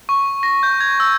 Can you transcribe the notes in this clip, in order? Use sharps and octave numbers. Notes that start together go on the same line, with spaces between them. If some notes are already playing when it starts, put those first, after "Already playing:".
C#6
A#6
G6
G#6
E6